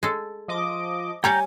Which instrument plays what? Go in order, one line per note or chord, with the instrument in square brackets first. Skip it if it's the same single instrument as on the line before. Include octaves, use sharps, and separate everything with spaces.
[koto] G#3 A4
[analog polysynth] F3 D#5 D6
[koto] G3 C#5 D5 [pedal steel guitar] G5 A#5 G6 [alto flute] G#5